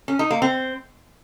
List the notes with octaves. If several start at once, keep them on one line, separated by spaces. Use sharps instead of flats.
C#4
D#4
A#3
C4